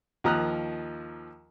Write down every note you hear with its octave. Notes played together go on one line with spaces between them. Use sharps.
D#2 F3 A#5 D#6 F6 F#6